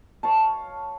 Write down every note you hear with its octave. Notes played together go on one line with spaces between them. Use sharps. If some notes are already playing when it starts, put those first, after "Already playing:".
C#5 F5 A5